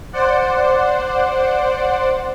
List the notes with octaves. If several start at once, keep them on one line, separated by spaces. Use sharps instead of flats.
C5 D5 F#5